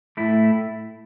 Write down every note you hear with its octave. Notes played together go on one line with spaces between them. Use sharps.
A2 A3 E4